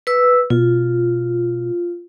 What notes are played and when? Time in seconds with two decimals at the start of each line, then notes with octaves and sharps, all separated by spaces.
0.07 B4 E6
0.50 B2 F4